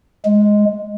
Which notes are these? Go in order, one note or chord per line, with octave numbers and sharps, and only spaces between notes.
G#3